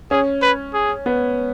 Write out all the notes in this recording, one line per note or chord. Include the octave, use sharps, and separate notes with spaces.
C#4 G#4
B4
G#4
B3